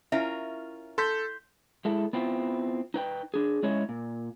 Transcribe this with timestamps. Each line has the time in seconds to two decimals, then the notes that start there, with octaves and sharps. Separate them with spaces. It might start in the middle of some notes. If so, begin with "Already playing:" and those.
0.12 C#4 E4 F4 A#4 E5
0.98 A4 C6 G6 B6
1.85 G#3 E4 A4
2.13 B3 C4 E4 F4
2.94 D#4 B4 G5
3.34 D4 G#4
3.63 G#3 C#4 E4 C#5 D#5
3.89 A#2